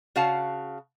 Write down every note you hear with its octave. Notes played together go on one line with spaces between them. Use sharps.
C#3 F#4 F5 A5